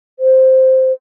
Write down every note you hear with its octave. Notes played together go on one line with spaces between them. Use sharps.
C5